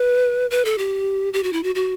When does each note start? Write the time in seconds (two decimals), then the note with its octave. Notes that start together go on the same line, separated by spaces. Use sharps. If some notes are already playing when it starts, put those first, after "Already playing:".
Already playing: B4
0.51 B4
0.65 A4
0.78 G4
1.33 G4
1.43 F#4
1.53 E4
1.63 F#4
1.75 F#4